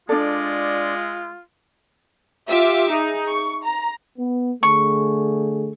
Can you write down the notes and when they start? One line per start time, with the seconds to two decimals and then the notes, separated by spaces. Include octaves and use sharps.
0.09 G#3 D4 F4 A4 D5
2.48 F4 G4 E5 D6
2.90 D#4 G#4
3.28 C#6
3.63 A#5
4.18 B3
4.63 D3 A3 G#4 C#6